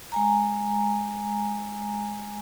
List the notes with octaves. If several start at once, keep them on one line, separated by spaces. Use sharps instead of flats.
G#3 G#5 A#5